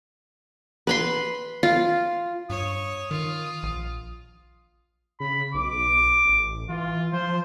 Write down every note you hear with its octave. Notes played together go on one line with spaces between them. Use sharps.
B4 B5 C6
F4
G2 C#5 D#6
D#3 F4
A#1
C#3 B5
B1 D6
A1
E3 F4
F3 C5